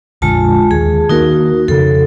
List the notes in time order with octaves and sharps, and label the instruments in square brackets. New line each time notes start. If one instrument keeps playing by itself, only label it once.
[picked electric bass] A#1 F2 D3 [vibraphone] G#3 F4 A5
[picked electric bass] D#2 [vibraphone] G#4
[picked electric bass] D#3 A#3 [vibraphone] D#4 F#4 A#4
[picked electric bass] F2 C#3 [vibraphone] A4